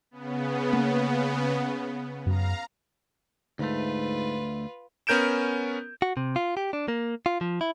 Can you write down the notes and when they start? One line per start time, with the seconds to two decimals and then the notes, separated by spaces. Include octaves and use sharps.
0.11 C#3 B3
0.73 A#3
2.26 F#2 F5 A#5
3.59 D2 G#2 A3 F4 B4
5.07 B3 C#4 A#4 G6 D7 E7
6.02 F#4
6.17 C3
6.36 F4
6.57 G4
6.73 D4
6.88 A#3
7.26 F4
7.41 F3
7.61 E4